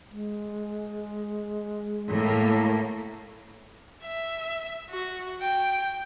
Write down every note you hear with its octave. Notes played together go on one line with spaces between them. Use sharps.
G#3
A2 A#3
E5
F#4
G5